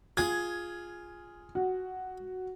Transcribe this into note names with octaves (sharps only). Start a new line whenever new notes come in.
F4 G#4 G#6
F#4